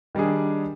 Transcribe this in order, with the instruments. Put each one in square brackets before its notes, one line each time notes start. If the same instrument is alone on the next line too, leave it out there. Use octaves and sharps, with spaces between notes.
[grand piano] D#3 G3 D4 G#4